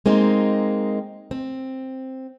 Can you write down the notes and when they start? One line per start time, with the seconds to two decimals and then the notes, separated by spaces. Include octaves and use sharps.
0.06 G#3 A#3 C4 D#4
1.31 C4